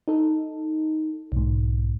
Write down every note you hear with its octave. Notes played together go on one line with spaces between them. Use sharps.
D#4 A4
B1 G#2